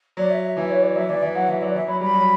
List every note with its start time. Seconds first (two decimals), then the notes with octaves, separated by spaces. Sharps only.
0.17 F#3 D5
0.30 E5
0.44 E5
0.57 E3 E5
0.70 C#5
0.83 D5
0.95 F#3 E5
1.09 E3 D5
1.22 E3 E5
1.35 F#3 F#5
1.48 E3 E5
1.61 F#3 D5
1.74 E3 E5
1.88 F#3 B5
2.00 G3 B5
2.14 F#3